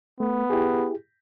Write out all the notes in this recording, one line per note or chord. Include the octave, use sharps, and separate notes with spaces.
A3 B3
E4 G4 G#4